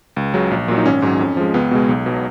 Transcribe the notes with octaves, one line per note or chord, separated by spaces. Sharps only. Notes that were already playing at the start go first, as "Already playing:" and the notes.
C#2
C#3 F#3
A#1
A#2 F#3
D#4
G#1 C#4
G#2 F#3
F2
F3 G#3
C#2 B3
B2 G#3
B1
B2 F#3